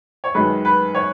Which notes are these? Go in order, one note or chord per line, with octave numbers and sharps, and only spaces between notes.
C#5
F#2 D#3 G#3 B4
B4
C#5